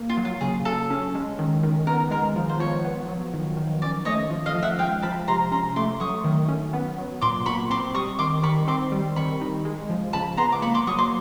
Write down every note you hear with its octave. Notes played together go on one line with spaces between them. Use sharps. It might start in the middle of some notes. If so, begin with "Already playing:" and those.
Already playing: A#3
F4
F#3
F4
C#3 G#4
C#3 A4
C#4
G#3
D#3
D#3
B3 A#4
G#3 A#4
F3
C5
F3 C#5
B3
F#3
D#3
D#3
C#4 D5
A3 C#5 D#5
F3
D#5 F5
F3
E5 F#5
G#3 F5 G5
F3 A5 B5
C3 A#5 C6
C#4 A#5 C6
A3 C6 D6
F#3 C#6 D#6
D#3
C#4
B3
F#3
A#2 C6 D6
A#2 B5 C#6
C4 C6 D6
G3 C#6 D#6
D#3 C6 D6
D#3 B5 C#6
C4 C6 D6
G3
D#3 B5 C#6
D#4
G#3
F3
C#3 A5 B5
B3 A#5 C6
D6
A#3 B5 C#6
C6 D6
F#3 C#6 D#6
C6 D6